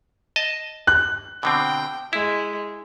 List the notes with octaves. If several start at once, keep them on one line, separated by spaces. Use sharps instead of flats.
D#5 A5
F#6
B2 D3 C4 G5
G#3 E4